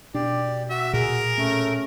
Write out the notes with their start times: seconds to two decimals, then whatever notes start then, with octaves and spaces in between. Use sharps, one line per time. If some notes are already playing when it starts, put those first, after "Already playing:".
0.15 B2 D4 G4 D5
0.70 F#4 E5
0.94 A#2 G#4 A#4
1.38 A3 C#4